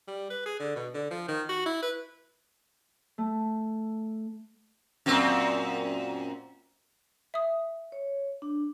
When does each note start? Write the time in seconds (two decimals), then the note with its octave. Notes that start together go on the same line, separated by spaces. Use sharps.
0.07 G3
0.30 B4
0.46 G#4
0.60 D3
0.76 B2
0.94 D3
1.11 F3
1.29 D#3
1.49 F#4
1.66 E4
1.82 B4
3.18 A3
5.06 F#2 A#2 C4
7.34 E5 D#6
7.92 C#5
8.42 D4